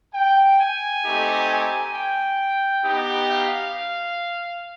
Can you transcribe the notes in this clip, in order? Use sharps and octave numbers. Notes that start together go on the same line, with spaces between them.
G5
G#5
A3 C4 D#4 G4
G#5
G5
B3 D#4 G4
F5